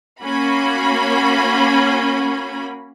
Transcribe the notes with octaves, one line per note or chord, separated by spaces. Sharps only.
A#3 C#4 F#4 B5